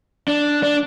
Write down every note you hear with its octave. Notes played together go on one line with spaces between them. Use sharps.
D4
D4